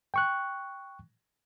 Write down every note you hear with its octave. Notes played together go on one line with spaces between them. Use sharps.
G5 C#6 F#6